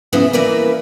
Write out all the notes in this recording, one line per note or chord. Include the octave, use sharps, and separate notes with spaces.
C#3 E3 F3 B3 E4
E3 A#3 E4 A#4 B4 D5